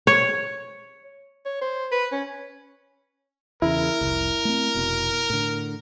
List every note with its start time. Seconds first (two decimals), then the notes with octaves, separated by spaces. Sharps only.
0.07 C#5
1.45 C#5
1.61 C5
1.92 B4
2.12 C#4
3.62 E2 C#3 E4 A#4
4.01 F1 C2
4.45 A3 C4
4.75 F1 B2
5.30 A2 D3